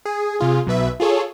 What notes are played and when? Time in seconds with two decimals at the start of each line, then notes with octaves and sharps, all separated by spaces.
0.05 G#4
0.39 C3 F4 G#4
0.67 B1 B2 B4 E5
1.00 F4 G#4 A4 C#5